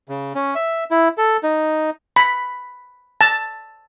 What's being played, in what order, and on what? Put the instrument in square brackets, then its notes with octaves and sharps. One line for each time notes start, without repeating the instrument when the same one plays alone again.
[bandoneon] C#3
C#4
E5
E4
A4
D#4
[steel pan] B5
A5